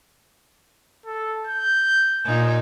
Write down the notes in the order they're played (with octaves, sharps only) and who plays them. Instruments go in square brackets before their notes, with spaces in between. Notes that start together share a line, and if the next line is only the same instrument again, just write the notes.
[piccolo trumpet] A4
G6
[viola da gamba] A#2 D#4 [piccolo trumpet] G#5